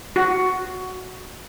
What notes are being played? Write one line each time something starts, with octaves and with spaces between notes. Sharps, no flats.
F#4